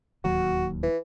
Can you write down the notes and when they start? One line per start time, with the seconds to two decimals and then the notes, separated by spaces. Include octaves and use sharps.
0.24 D1 D#2 F#3 F#4
0.83 E3